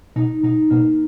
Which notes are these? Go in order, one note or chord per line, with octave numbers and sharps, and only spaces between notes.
B2 D#4
B2 D#4
B2 A#3